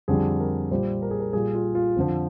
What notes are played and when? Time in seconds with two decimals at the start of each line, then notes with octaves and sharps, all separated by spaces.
0.08 F2 D3 G3 G#4
0.40 A#4
0.71 A#2 G3 C5
1.02 A#4
1.11 G#4
1.20 A#4
1.33 A#2 G3 G#4
1.55 F4
1.75 F4
1.96 F2 D3 F3